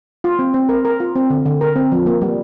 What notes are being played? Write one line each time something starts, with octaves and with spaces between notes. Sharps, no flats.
F4
C4
C4
A#4
A#4
F4
C4
D3
D3
A#4
C4
F3
A#3
G3